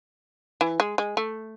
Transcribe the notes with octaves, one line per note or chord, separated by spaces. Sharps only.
E3
G#3
G#3
A3